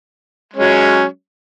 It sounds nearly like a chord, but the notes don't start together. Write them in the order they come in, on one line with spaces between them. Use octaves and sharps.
G#3 C#4 F#3